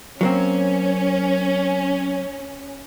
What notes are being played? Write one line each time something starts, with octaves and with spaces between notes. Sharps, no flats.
F#3 A#3 C4 C#4